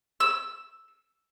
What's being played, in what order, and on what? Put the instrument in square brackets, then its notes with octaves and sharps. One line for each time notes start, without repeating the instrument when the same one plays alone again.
[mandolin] E6